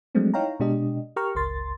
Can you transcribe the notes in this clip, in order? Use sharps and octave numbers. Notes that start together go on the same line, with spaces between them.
F3 F#3 G#3 A3 C4 D4
D#4 E4 C#5 F5 G5 A#5
B2 G#3 D4 G4 D#5
G4 A#4 G5 A#5 C#6 F6
G1 C#2 A#4 C6 A6